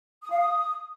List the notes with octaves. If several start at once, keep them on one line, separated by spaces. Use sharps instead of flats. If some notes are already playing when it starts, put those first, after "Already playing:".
D#6
F5
D#6